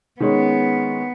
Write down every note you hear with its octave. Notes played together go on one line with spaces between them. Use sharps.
D#3 G#3 B3 C#4